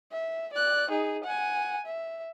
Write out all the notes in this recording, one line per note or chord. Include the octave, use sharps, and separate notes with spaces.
E5
D5 F#6
D#4 G#4
F#5 G#5
E5